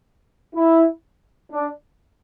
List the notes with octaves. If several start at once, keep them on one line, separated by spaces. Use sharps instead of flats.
E4
D4